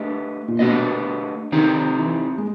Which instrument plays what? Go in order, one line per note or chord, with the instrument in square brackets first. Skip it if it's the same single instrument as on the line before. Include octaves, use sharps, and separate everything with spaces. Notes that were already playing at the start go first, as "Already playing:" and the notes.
Already playing: [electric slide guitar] A3 D4 G4 B4 D#5
[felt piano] A#2
[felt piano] B2 [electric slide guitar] A3 D4 G4 B4 D#5
[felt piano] D#3 [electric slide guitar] C4 D#4 G4
[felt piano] E3
G#3